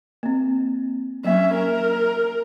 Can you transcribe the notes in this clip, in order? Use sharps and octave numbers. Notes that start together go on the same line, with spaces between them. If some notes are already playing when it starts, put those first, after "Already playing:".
A#3 C4
F#3 A#3 C#4 E5
A#4